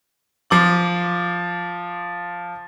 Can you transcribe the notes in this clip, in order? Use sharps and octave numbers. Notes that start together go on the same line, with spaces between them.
F3 D6 F#7